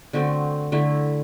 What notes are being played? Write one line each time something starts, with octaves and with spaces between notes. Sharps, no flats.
D3 A3 C4 F#4
D3 A3 E4